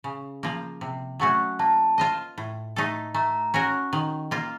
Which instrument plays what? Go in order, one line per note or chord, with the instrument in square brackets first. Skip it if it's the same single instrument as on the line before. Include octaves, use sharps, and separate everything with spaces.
[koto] C#3
F3 A#3
C3
F#3 A3 C#4 F#4
[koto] A#3 [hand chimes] A5
[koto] F4 C5 D#5
A2
A3 D#4 A4
[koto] A3 [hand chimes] A#5
[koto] C#4 F#4 A#4
D#3
A#3 F4